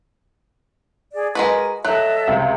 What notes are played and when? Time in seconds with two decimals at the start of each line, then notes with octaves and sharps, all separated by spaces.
1.13 G#4 D5
1.35 G#3 F#4 A#4 B4 G#5
1.85 F#3 A4 D#5 E5 F#6
2.28 C#2 C3